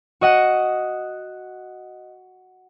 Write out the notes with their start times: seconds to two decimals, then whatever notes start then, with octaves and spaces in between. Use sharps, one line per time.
0.21 F#4 D#5 F#5